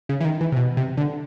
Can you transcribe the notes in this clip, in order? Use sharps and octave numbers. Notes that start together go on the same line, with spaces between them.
C#3
E3
D#3
E3
C3
B2
C3
D3